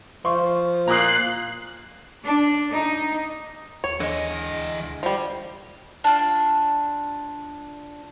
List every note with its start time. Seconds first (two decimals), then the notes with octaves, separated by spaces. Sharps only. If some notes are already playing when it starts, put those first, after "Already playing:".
0.25 F3 C6 C#6
0.88 A#2 A#5 D#6 F#6 C7
2.24 D4
2.71 D#4
3.84 D#2 C#5
4.00 D3 E3 G#3 D#5
4.54 D2
5.03 F3 G3
6.04 D4 F4